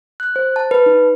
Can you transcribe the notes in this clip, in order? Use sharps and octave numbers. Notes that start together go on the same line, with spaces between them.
F#6
C5
A5
B4
D#4